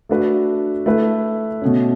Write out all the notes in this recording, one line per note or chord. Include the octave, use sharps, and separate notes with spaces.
A3 D4 F#4 B4
A3 E4 B4
B2 A3 C#4